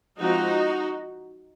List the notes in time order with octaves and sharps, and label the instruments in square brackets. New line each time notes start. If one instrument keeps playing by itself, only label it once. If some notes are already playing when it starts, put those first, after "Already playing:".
[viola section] F3 G#3 C4 D#4 F#4